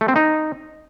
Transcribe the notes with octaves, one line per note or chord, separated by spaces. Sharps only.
A3
C4
D#4